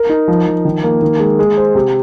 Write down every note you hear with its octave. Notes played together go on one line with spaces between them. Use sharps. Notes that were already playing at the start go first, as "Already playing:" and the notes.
Already playing: A#4
D#4
F3
F3
D#3
A#3
D#3
G#3
G#3
C5
C3